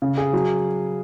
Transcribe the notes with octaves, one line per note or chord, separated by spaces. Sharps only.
C#3
G#4
F#3